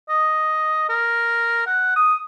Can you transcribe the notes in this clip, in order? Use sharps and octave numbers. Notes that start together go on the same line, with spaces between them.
D#5
A#4
F#5
D#6